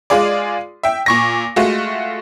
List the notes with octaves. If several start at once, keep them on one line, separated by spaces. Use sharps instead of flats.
G#3 F4 G#4 D5
E5 G5
A#2 C#6 A#6
G#3 A3 F4 F#4